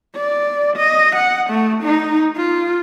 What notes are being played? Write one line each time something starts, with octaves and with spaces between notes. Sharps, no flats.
D5
D#5
F#5
A3
D#4
F4